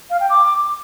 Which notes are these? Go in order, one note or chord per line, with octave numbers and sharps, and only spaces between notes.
F5
G5
D6